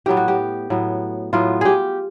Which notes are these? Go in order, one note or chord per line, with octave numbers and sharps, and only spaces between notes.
A2 F#3 B3 G4
F#4
G4
A2 F#3 B3
A2 F#3 B3 F4
G4 G#4